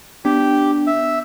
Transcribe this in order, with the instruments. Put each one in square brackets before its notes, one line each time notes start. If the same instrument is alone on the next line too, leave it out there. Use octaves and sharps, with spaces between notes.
[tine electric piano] B3 D4 [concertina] G4
[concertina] E5